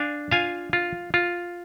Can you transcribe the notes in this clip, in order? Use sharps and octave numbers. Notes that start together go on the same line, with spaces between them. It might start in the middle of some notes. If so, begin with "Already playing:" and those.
Already playing: D4 F5 G#5
F4 F5 G#5
F4
F4